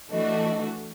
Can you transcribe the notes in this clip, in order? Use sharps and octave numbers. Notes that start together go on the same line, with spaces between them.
E3 A3 D4 F#4 D#5